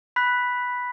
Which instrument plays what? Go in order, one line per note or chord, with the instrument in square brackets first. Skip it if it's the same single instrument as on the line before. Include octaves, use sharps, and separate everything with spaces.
[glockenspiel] B5 F#6 B6